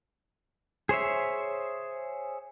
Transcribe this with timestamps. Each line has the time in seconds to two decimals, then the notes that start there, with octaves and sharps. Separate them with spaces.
0.89 G#4 C5 C#5 E5